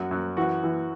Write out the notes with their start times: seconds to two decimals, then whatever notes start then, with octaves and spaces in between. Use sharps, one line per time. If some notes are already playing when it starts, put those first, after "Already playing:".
Already playing: F#2 F#4
0.11 F#2
0.37 E3 F#4
0.63 E3